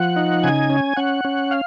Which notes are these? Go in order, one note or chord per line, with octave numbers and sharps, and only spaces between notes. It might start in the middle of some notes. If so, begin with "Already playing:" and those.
Already playing: F3 F#5
D#4
C#3 G#5
C#4
C#4 F#5
C#4
F5